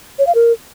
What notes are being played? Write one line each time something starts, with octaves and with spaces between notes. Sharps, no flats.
C#5
F5
A#4